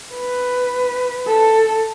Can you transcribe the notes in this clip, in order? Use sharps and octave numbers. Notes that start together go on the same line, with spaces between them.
B4
A4